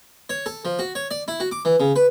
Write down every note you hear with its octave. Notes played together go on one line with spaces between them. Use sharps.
C#5
A4
F3
F#4
C#5
D5
E4
F#4
D6
E3
C#3
B4